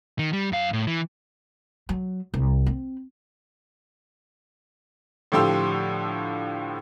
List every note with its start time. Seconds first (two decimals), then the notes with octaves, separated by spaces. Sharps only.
0.19 D#3
0.33 G3
0.52 F#2 F5
0.73 A2
0.87 E3
1.89 F#3
2.34 C2
2.66 C4
5.32 A2 D3 F3 G4 C6 E6